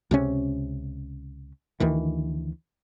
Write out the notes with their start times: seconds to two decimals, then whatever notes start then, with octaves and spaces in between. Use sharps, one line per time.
0.11 C#2 C3 C#4
1.80 D2 D#3 E3